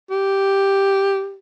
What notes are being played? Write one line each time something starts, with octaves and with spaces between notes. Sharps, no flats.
G4